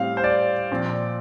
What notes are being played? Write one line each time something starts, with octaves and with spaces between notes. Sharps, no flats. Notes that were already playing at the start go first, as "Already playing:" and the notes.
Already playing: A2 G3 C4 F5
C5
D5
A#2 F3 C4